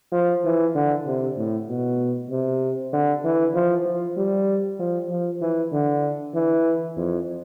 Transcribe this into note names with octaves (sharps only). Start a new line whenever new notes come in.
F3
E3
D3
C3
A2
B2
C3
D3
E3
F3
F3
G3
F3
F3
E3
D3
E3
F2